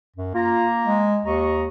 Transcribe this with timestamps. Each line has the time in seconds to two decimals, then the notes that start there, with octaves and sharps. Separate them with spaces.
0.16 F#2
0.35 A#3 F4 A#5
0.86 G#3
1.25 D#2 D#5 A#5 C#6